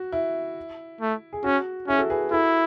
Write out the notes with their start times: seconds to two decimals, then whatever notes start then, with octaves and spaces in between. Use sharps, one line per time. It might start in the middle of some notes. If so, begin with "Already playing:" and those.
Already playing: F#4
0.12 E4
1.01 A3
1.33 G#4
1.44 C#4 F#4
1.88 C#4 E4 G#4
1.98 F#4 A4
2.10 G#4 B4
2.31 E4 F#4 A4